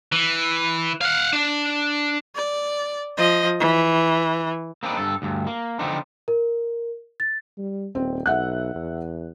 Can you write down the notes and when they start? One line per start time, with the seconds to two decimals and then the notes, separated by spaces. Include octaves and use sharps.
0.12 E3
1.01 F5 F#5
1.33 D4
2.35 D5
3.17 F3 D#5
3.60 E3
4.83 A#3 C4 D4 D#4 B4
4.97 G2 A4
5.22 D2 G2
5.47 A#3
5.79 D3 F3 B3 C4 D4 D#4
6.28 A#4
7.20 A6
7.58 G3
7.95 D#1 C4
8.26 B1 E5 F#5 F#6
8.75 E2